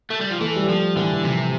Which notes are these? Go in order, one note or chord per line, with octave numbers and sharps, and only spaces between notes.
A3
G3
F3
E3 A3
G3
F3 A3
D3 E3
E3
C3 F3